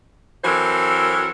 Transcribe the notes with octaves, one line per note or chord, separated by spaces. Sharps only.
E3 F#3 C4 A4 A#4 C5